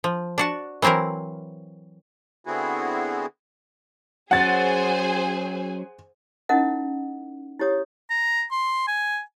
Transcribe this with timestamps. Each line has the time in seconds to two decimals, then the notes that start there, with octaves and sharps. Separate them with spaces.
0.04 F3
0.38 D4 F#4 A5
0.82 E3 F#3 C4 E4 A#4
2.45 D3 B3 C4 E4 F#4 G#4
4.31 F#3 C#4 G#4 C5 F#5 G#5 A6
6.49 C#4 D#4 E4 A#4 D#5 F#5
7.59 E4 G4 C#5 D#6
8.10 A#5
8.51 C6
8.87 G#5